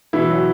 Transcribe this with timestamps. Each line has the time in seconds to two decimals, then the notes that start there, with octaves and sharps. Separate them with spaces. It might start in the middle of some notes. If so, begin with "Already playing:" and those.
0.13 B2 E3 E4
0.30 F#3